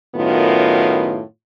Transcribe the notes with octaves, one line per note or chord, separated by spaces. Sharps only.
F#2 A2 D#3 B3 F4